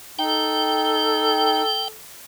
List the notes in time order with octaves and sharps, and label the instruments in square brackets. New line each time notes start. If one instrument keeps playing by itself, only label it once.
[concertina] D#4 [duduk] A4 [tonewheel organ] G5